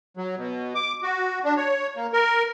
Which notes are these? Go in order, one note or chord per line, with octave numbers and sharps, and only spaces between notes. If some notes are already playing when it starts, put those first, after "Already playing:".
F#3
B2
D6
F#4
D4
C#5
A#3
A#4